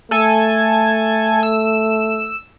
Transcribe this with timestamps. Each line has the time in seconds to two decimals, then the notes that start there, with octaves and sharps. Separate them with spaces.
0.11 A3 A4 G#5
1.43 E6